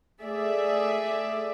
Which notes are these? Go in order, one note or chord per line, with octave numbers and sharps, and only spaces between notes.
A3 G#4 D5 E5